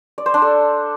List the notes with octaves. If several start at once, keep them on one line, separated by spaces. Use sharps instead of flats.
D5
C5
D4
A4